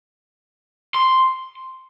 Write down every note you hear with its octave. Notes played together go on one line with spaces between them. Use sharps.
C6